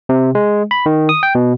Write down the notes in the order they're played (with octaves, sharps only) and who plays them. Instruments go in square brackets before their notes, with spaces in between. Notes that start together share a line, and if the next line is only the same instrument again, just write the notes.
[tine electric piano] C3
G#3
B5
D#3
D#6
G5
B2